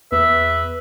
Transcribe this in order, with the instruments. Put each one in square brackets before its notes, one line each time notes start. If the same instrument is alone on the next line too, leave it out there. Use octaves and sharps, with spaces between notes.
[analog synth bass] E2 [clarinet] B4 [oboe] E5